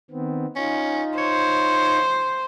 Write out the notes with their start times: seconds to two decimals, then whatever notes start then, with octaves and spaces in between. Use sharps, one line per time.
0.11 D#3 B3 C4
0.56 C#4 D#4 F4
1.18 C5 C#5